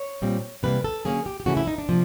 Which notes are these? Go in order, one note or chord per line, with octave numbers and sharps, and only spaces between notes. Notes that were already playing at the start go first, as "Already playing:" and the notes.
Already playing: C#5
A#2 G3 C4
C3 E3 G3 A#3 B4
A4
D3 F#3 A#3 C#4 G#4
G4
G4
C#3 E3 A3 C#4 F#4
E4
D#4
D4
C3 F3 A#3